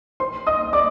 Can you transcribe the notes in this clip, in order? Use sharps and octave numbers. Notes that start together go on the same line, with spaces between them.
C5 C6
D#5 D#6
D5 D6